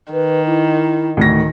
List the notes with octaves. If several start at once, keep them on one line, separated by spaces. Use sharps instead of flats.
D#3 B4
E4
D2 A2 D#3 A#6